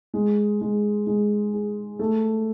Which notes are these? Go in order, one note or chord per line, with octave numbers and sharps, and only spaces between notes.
G#3
G#3
G#3
G#4
A3